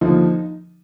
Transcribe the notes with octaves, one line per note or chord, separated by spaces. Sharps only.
D#2 D3 F3 D#4